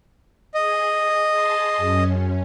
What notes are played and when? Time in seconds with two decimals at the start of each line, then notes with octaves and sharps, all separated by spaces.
0.54 G#4 D#5
1.30 G#4 A5 C6
1.77 F#2 C#4